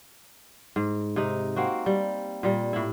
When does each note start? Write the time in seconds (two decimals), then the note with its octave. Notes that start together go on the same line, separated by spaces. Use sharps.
0.76 G#2
1.16 C3 D#4
1.56 A#3 C4 F#4
1.86 G3
2.43 A#2 G3
2.73 A2 E4